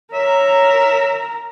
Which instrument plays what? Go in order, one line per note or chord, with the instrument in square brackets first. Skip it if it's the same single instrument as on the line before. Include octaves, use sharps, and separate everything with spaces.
[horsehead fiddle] A#4 A#5 [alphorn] C#5 [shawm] E5